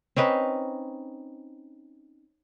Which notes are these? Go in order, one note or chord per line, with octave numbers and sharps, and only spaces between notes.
C4 C#4 D#4 B4